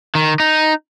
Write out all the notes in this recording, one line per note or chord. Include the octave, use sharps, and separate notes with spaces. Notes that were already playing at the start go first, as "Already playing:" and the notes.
D#3
D#4